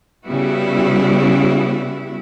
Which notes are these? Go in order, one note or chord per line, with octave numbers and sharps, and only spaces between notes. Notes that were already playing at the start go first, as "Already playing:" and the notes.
C#3 G3 B3 E4 F#4